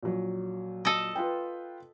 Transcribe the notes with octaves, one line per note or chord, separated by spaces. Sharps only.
A#1 F#3
A4 D#5
F4 B4 G5